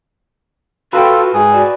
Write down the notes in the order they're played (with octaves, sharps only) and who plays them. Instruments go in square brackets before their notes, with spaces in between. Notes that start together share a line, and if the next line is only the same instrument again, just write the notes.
[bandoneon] F4 A4 [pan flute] F#4 [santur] B4 G5
[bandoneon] G#2 G#4
[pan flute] F#4 [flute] D5